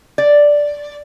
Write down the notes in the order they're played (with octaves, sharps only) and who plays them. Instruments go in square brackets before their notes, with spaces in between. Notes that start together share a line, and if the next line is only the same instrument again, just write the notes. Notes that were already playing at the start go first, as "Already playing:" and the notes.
[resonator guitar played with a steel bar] D5